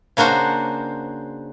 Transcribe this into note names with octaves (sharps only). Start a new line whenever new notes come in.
C#3 A#3 D4 F#4 C5